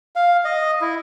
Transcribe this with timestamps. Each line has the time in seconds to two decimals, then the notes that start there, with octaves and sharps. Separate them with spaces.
0.16 F5
0.45 D#5
0.81 E4